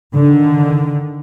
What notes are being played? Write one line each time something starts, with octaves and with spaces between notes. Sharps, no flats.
D3 D#3